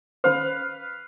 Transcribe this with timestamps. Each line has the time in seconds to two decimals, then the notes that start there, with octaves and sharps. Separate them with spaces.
0.24 D#3 C#4 B4 C5 F5